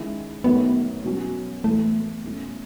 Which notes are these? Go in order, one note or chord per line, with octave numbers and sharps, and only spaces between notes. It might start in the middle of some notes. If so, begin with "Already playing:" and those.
Already playing: D#3 G#3 C#4 E4
F#2 D#3 A3 B3
B2 F#3 C#4
A2 E3 A3 B3
B2 A3 C#4